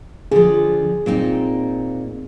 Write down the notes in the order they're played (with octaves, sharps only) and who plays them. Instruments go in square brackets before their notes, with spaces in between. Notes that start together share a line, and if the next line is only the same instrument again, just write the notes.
[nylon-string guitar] D3 F3 [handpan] G#4
[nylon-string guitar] A#2 C4 D#4